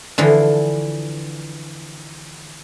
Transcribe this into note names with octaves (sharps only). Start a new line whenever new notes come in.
D3 E3 F3